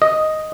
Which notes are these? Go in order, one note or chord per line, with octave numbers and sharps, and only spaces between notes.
D#5